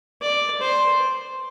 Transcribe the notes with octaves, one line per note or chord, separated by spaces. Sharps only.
D5
C5